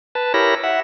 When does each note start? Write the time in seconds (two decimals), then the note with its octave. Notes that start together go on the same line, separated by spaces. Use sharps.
0.15 B4 A5
0.34 E4 G4 A#4 C#5 B5 A#6
0.63 E5 F#5